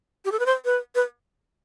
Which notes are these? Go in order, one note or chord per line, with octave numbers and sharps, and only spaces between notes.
G4
A4
B4
C5
B4
B4